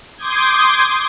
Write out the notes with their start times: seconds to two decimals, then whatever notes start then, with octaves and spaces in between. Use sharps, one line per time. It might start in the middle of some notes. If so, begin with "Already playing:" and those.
0.17 C6 D6 D#6 G6 G#6